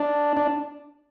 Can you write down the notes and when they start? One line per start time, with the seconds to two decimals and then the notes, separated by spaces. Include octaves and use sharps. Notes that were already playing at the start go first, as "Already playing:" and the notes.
Already playing: D4
0.37 D4